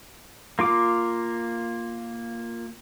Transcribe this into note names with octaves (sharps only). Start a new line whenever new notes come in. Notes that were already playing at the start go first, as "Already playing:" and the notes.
A#3 F4 D6